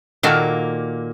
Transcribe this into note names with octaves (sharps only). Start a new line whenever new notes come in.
A#2 D#3 A#3 F#4 A4